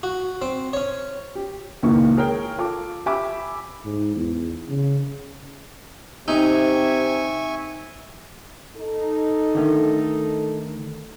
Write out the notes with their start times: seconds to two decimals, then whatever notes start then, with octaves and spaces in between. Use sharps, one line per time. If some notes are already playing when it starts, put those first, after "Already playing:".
0.03 F#4
0.42 C4
0.73 C#4 C#5
1.35 G4
1.83 C#2 A#2 D#3 E3 A#3 C#6
2.17 G#4 A#4 C#5 G5
2.58 F4 A4 D6
3.06 G4 E5 G#5 B5 D6
3.85 G#2
4.16 E2
4.68 C#3
6.28 C3 D#4 E5 G#5 C#6
8.77 D#4 A4
9.55 D3 D#3 A3